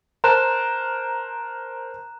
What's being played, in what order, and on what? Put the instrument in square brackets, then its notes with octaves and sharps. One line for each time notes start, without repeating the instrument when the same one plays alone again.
[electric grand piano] A#4 C5 A5 [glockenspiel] A#5 F#6 E7